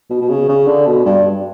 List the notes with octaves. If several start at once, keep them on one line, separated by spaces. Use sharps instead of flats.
B2
B2
C#3
C#3
D3
B2
G2